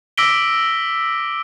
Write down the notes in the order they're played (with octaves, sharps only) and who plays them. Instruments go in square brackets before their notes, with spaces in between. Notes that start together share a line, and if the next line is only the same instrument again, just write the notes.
[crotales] D6 E6 A#6 B6 D7 G7